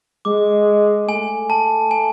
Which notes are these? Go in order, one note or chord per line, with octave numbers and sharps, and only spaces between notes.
G#3 D6
A3 G#5
A5
G#5